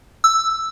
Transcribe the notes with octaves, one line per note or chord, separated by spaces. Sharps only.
E6